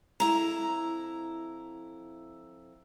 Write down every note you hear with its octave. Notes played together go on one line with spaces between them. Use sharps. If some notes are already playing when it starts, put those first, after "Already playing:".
F2 E4 A#5